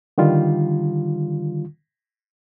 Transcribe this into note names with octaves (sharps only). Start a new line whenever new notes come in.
D3 D#3 G3 F4